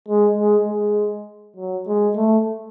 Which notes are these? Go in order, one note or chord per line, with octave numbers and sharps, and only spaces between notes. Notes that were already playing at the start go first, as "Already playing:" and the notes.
G#3
G#3
G#3
F#3
G#3
A3